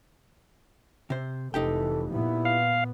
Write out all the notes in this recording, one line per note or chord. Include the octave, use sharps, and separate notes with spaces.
C3 C5
F1 E3 D#4 G4 A4 G5
A#2 B3 E4
F5